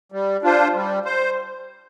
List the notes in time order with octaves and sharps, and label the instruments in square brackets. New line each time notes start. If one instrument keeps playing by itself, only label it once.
[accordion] G3
D4 F4 C5
G3
C5